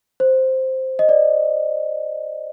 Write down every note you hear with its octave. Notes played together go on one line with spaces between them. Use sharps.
C5
D#5
D5